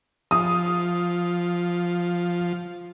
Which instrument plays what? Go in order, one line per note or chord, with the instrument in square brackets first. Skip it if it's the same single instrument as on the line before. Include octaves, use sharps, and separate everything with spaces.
[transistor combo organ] F3 [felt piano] D#6